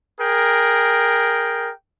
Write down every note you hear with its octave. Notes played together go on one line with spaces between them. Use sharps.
G#4 A#4 G5